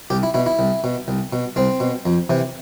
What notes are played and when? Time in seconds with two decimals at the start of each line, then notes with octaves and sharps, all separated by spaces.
0.10 C2 G4
0.23 E4
0.34 B2 E4
0.46 E4
0.59 C2
0.84 B2
1.08 C2
1.33 B2
1.56 C2 C4
1.80 B2
2.06 F2
2.30 C3 E3